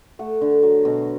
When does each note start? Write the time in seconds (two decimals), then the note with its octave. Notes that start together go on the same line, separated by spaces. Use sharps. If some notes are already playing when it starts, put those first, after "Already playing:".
0.19 A3 F#5
0.41 D3
0.63 F#3
0.85 B2